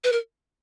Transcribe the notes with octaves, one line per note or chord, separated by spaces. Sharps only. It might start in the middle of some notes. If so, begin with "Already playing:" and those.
B4
A#4